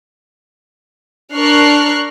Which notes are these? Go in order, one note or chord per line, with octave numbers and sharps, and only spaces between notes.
D4 A#4 C#6 F6 F#6 C7